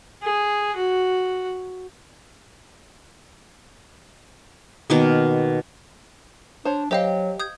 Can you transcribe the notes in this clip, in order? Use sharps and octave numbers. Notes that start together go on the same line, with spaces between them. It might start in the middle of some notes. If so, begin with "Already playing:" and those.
G#4
F#4
B2 D#3 A#3
D4 C5 C#5
F#3 G4 C5 D#5 F5 G5
D#6 G6 G#6